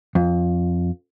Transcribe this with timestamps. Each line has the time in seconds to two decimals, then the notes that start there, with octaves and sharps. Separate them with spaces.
0.15 F2